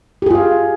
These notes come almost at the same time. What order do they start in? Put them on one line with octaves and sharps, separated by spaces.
G4 G#4 F4 F5